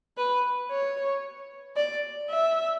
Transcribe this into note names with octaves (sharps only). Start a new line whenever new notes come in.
B4
C#5
D5
E5